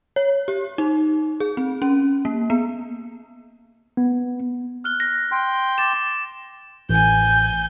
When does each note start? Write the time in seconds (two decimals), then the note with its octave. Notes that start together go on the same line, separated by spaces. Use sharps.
0.16 C#5
0.48 G4
0.78 D#4
1.40 G#4
1.57 C4
1.82 C#4
2.25 A#3
2.50 B3
3.97 B3
4.84 F6 F#6 G7
5.00 A#6
5.32 G5 C6
5.78 D6 A6 E7
6.89 A1 G#5 G6